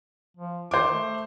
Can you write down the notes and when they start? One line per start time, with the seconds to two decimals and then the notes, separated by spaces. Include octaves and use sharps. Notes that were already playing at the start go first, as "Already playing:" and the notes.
0.37 F3
0.71 D#3 C5 D6
0.92 A3